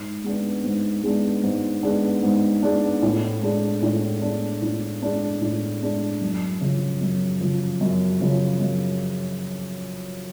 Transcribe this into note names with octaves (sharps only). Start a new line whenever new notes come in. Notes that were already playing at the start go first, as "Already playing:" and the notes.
Already playing: G#2
G#3 B3 D4
G#2
G#3 B3 D4
G#2
G#3 B3 D4
G#2
G#3 B3 D4
A2
G#3 D4
A2
G#3 D4
A2
G#3 D4
A2
G#3 D4
F#2
C#3 F3
F#2
C#3 F3
F#2
C#3 F3
F#2